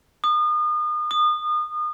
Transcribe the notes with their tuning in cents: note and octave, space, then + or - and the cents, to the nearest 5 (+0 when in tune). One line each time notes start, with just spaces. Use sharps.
D#6 -35
D#6 -30